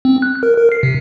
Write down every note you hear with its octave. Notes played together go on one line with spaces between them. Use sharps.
C4
F#6
A#4
A#4
C7
C3